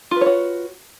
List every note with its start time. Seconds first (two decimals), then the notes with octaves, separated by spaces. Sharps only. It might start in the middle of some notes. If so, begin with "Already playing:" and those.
0.11 F4
0.16 B4
0.21 C#5
0.26 F#4